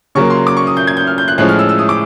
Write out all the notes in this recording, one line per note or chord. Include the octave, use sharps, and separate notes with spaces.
C#3 F#3 A#3 C#6
C6
D6
C#6
D#6
G6
G#6
G6
F6
G6
F#6
A2 F3 G#3 C#4 F#6
F6
E6
E6
D#6
D6